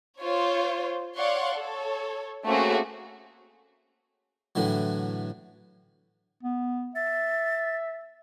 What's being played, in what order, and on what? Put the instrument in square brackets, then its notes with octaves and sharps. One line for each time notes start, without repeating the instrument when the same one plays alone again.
[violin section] F4 C5 C#5
C#5 D5 F5 F#5 C6 C#6
A4 C#5
A3 A#3 C4 C#4 F#4 G#4
[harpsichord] A2 D3 E3 F#3
[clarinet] B3
[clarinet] E5 [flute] A6